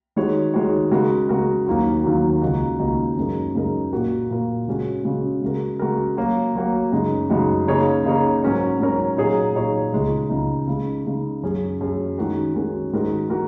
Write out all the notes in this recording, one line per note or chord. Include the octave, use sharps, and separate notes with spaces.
D#3 G#3 F#4 C#5
D#3 G#3 F#4 C#5
C#3 G#3 F#4 A#4
C#3 G#3 F#4 A#4
D#2 D#3 F#3 A#3 F#4
D#2 D#3 F#3 A#3 F#4
C#2 C#3 A#3 D#4 F#4
C#2 C#3 A#3 D#4 F#4
F#2 C#3 G#3 D#4 A#4
F#2 C#3 G#3 D#4 A#4
A#2 A#3 F#4 A#4
A#2 A#3 F#4 A#4
C#3 G#3 C#4 F#4
C#3 G#3 C#4 F#4
C#3 G#3 F#4 A#4
C#3 G#3 F#4 A#4
F#3 A#3 F#4 C#5
F#3 A#3 F#4 C#5
F#2 C#3 G#3 D#4 F#4
F#2 C#3 G#3 D#4 F#4
C#3 A#3 D#4 G#4 C#5
C#3 A#3 D#4 G#4 C#5
G#2 F#3 C#4 A#4 C#5
G#2 F#3 C#4 A#4 C#5
A#2 F#3 D#4 G#4 C#5
A#2 F#3 D#4 G#4 C#5
C#2 C#3 G#3 D#4
C#2 C#3 G#3 D#4
C#3 G#3 D#4
C#3 G#3 D#4
F#2 F#3 C#4 G#4
F#2 F#3 C#4 G#4
D#3 G#3 C#4 F#4 A#4
D#3 G#3 C#4 F#4 A#4
G#2 D#3 G#3 F#4 A#4
D#3 G#3 F#4 A#4